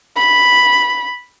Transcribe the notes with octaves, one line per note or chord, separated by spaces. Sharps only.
B5